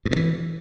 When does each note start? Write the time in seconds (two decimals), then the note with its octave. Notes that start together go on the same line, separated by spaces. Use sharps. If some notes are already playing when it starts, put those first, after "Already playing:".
0.05 G2
0.11 A#2
0.16 E3